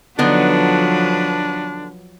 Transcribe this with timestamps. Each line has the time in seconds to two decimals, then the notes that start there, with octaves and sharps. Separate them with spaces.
0.19 D3 F3 F#3 B3 D4 D#4 B4